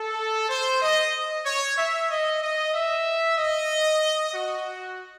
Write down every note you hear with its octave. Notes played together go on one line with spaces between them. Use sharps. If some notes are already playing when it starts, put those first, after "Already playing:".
Already playing: A4
C5
D#5
C#5
E5
D#5
D#5
E5
D#5
F#4